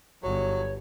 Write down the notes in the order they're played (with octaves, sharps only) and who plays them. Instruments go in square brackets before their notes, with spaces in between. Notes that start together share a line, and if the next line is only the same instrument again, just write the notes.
[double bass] G1 [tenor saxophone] F#3 [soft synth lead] C#5